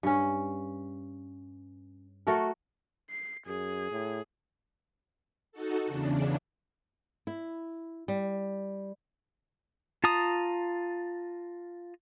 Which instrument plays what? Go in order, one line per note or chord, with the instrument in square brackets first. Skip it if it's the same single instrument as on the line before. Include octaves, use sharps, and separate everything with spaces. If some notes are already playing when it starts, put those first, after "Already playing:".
[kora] G2 C#4
A3 F#4 A4 A#4
[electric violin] C7
[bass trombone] F#2 [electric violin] G#4
[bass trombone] A2
[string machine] D#4 F#4 A4
E2 C#3 D4
[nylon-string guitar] E4
G3
[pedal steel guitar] F4 A5 A#5 D#6